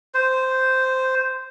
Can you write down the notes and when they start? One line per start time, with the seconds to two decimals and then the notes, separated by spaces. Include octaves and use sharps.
0.14 C5